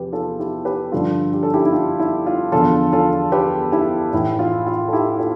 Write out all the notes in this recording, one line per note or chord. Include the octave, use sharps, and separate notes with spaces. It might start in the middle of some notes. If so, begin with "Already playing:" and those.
Already playing: E2 C3 F3 G4 B4
F4 A4
E4 G4
G4 B4
G2 D3 F3 F4 A4
G4
A4
E4 G4
E4
F4
E4
F4
E2 D3 F3 F4 A4
F4 A4
G4 B4
E4 G4
A2 E3 E4
F4
F4
A4
E4 G4
F4 A4